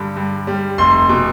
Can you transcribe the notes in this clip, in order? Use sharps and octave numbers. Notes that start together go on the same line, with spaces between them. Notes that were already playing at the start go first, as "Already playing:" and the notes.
Already playing: G2 D3 G3
G2
G3
F1 C6
B2